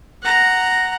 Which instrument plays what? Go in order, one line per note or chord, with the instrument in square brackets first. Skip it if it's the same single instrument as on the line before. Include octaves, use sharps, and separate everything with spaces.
[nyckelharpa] F#5 A#5